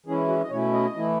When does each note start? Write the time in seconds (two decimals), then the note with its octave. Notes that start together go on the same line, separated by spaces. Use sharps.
0.06 E3 G#3 C#4 E4 G#4
0.28 F#4
0.43 D#5
0.51 B2 A3 C#4 E4 C#5
0.73 D#5
0.96 E3 A3 E4